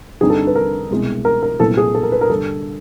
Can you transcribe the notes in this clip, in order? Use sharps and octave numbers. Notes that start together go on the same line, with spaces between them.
G2 D3 G3 C4 D#4 G#4
A4
B4
A#4
C2 B2 G#3
A#4
A#4
C2 A#2 F#3 B3 E4 A4
G#4
A4
A#4
B4
A#4
G2 D3 G3 A4